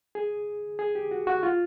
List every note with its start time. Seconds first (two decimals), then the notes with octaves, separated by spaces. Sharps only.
0.15 G#4
0.79 G#4
0.95 G4
1.11 F#4
1.27 F#4
1.43 F4